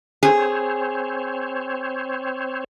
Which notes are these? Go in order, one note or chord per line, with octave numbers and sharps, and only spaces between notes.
C4 G#4 C5 C#5